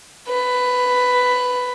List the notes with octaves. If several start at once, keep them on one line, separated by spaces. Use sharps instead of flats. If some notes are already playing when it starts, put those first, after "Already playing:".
B4